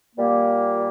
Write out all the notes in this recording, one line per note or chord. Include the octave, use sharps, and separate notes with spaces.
A#2 G3 A#3